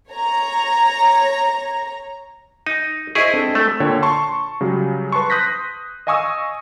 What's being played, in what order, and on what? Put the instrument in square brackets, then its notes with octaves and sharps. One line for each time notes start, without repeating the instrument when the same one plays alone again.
[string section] C#5 A#5
[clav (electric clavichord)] D#4 [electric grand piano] D#7
[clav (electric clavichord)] E4 G#4 [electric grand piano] C5 D#5 C#6
[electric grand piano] C4 D4 A4
[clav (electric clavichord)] A3
[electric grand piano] A#2 D3 C#5 G5 A5
A5 C6 C#6
C#3 F#3 G3
B4 A5 C6 C#6
C6 D#6 F#6 G6 A#6 B6
D#5 F5 G#5 C#6 D#6 E6